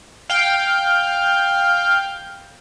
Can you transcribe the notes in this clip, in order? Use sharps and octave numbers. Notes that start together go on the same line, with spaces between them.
F5 G5